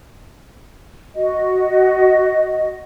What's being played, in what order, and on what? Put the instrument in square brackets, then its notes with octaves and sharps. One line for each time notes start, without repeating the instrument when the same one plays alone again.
[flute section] F#4 D#5